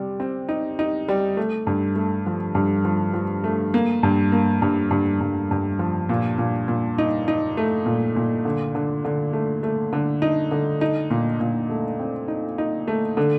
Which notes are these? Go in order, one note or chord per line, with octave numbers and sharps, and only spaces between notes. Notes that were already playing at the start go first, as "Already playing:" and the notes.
Already playing: C3 G3
C4
D#4
D#4
G3
A3
G2
A3
F3
G2
F3
F3
A3
A#3
G2
A#3
G2
G2
G2
G2
F3
A#2
A#2
A#2
D#4
D#4
A3
A#2
A#2
D3
D3
D3
A3
A3
D3
D#4
D3
D#4
A#2
A#2
A3
C4
D#4
D#4
A3
D3